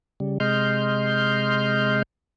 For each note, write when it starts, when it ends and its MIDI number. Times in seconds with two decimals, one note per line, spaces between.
0.20 0.38 49
0.20 0.38 55
0.40 2.02 48
0.40 2.02 56
0.40 2.02 75
0.40 2.02 84
0.40 2.02 89
0.40 2.02 91